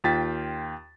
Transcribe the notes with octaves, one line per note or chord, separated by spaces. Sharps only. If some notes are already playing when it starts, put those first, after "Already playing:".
D#2 F4 G5 A6 B6